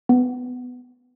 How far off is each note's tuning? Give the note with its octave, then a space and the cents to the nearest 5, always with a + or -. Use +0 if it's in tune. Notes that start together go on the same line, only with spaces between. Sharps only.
B3 +10